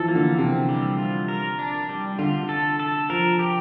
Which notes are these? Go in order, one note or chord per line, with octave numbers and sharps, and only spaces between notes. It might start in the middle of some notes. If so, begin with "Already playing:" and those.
Already playing: E3 F3 A4
A#3
D3
C3 C4
G3
F4
A#4
D4
G3
D3 F4
A4
A4
F3 A#4
G4